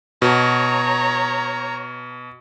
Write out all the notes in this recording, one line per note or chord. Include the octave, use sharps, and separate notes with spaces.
B2 C#5 A#5